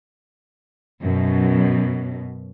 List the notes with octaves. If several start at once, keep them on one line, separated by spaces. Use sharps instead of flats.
F#2 B2